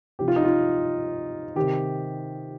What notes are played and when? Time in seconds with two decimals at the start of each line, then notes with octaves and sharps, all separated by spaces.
0.19 C3 F3 G4
0.28 F4
0.36 D#4
0.44 F4
1.56 C3 D#3 G4